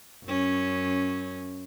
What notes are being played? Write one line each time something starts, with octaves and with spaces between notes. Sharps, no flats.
F#2 C#4